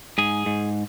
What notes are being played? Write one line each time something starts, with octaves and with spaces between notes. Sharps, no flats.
G#2 G#4
G#2